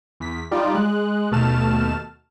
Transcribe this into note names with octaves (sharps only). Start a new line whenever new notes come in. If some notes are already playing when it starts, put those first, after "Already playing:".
E2 B6
G3 D#4 F4 G4 D5
G#3 F#6
D#2 B2 A3 A5 F6 E7